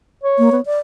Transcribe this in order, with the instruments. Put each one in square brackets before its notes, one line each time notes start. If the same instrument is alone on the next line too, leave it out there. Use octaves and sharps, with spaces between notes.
[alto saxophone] C#5
[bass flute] A#3
B3
D5